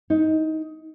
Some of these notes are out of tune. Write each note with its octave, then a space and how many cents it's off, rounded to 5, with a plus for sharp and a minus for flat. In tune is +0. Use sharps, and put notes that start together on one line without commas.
D#4 +20